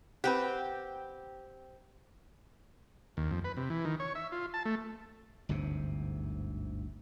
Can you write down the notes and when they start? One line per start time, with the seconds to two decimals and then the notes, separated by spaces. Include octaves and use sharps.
0.24 C4 G4 B4 F#5
3.17 D#2
3.31 F2
3.44 B4
3.57 C3
3.70 E3
3.85 D#3
4.00 C#5
4.15 E5
4.32 F4
4.54 A5
4.65 A3
5.49 G1 D2 G#2 C3